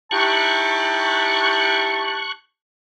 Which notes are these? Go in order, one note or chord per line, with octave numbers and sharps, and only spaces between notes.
D#4 E4 G4 A5 C#6 F#6